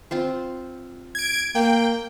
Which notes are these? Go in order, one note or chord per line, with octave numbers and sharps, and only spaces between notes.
C4 F4 C5
G#6 D7
A#3 G5